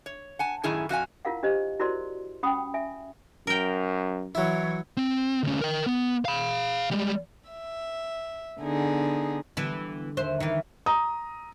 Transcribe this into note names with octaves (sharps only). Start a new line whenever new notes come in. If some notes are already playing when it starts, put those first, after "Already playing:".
C#5
F#5 G#5 A5
F#2 A2 D#3 E4 G#4 G#5
F2 F#4 F5 G#5
E4 F4 A#4 F5 F#5
D4 G4 C5 D#5
E4 F#4 A#4 C5 D5 C6
C#4 F#5 G5 B5 D#6
E5 G#5
F#2 A#4 G5
E3 F#3 E4 C#5
C4
D2 C#4
A#4 G5
B3
F5 B5
G3 G#3
E5
D3 B3 D#4 G#4
D3 E3 G3 B3 E4
D#2 C5 E5 F#6
D#3 E3 E5
A#5 D#6